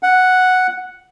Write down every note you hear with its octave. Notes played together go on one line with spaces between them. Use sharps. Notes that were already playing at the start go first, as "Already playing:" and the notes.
F#5